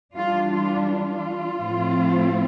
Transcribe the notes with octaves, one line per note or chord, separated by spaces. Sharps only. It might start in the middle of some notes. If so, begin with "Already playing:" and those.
E3 G3 D4 F4
F4
F4
A2 F3 C4